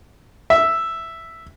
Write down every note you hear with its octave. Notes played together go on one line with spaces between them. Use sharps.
E5